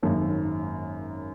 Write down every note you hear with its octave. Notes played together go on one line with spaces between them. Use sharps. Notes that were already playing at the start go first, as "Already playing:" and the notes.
G#1 F#2 D#3 A#3 C#4